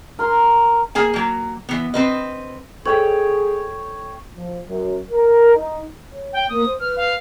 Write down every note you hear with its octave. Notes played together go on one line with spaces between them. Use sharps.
A#4 C6
A#3 G#4 G#5
F#3 A#3
E3 B3
C4 B4 D#5
G#4 A4 C#5 G5
F3
F#2
A#4
D#4
C#5
G5
A#3 D#6
C5
B4 F6
F5